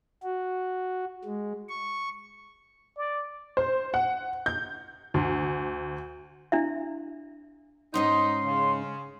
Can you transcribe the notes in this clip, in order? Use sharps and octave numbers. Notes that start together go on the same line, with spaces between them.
F#4
G#3
C#6
D5
C5
F#5
G6
D2
D4 E4 E5
G#2 C#4 D#4 F#5 C6
C#3